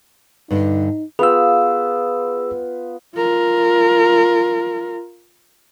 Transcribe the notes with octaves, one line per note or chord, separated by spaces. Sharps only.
G2 D3 D#4
B3 F4 G#4 G5 E6
F4 A#4